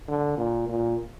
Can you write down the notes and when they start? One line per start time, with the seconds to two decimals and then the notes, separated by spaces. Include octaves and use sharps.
0.08 D3
0.37 A#2
0.68 A#2